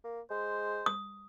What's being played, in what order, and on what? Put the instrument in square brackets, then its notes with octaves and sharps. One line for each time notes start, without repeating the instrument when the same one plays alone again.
[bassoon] A#3
[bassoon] G#3 [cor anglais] C5
[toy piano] D#6